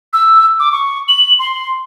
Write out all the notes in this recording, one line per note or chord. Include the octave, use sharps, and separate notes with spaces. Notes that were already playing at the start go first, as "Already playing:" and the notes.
E6
D6
C#6
F#7
C6